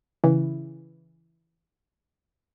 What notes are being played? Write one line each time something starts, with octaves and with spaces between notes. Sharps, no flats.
C#3 E3